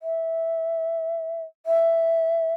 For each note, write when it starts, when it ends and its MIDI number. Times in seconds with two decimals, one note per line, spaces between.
0.03 1.43 76
1.66 2.54 76